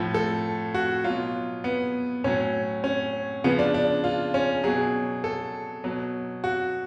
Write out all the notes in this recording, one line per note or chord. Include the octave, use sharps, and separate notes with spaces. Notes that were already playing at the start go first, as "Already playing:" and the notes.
Already playing: A2 F3
A4
F#4
B2 F#3 F4
B3
A2 F#3 C#4
C#4
C#3 F3 B3
D4
D4
F4
C#4
B2 F#3 G#4
A4
B2 F#3
F#4